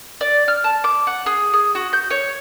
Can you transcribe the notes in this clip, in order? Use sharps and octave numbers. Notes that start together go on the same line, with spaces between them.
D5
F6
A5
D6
F#5
G#4
G#4
F#4
G6
C#5